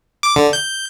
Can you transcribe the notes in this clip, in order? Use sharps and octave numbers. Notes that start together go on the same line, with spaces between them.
D6
D3
G6